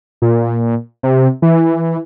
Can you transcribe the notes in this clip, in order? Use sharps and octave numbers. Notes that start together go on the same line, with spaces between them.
A#2
C3
E3